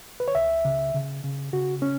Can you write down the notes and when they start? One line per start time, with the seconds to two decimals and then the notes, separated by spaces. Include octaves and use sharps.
0.20 B4
0.28 C#5
0.35 C#2 E5
0.65 C#3
0.94 C#3
1.24 C#3
1.53 C#3 F#4
1.82 C#4